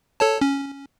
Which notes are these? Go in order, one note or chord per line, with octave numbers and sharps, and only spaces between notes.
A4 C#5 A5
C#4